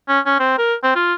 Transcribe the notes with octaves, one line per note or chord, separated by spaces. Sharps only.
C#4
C#4
C4
A#4
C4
F4